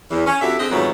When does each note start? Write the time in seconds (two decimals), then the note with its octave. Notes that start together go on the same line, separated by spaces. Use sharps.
0.10 E2
0.25 C#4
0.41 F2 D3 F#4 G4 E5
0.58 D3 C4 G#4 D#5
0.70 F2 G#2 D#3 F#3 A3 B3